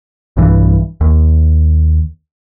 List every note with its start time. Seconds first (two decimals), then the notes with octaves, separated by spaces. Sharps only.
0.37 B1 G2 E3
1.01 D#2